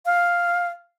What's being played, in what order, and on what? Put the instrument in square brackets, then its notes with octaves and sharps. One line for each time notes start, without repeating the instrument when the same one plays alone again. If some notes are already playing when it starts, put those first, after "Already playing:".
[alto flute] F5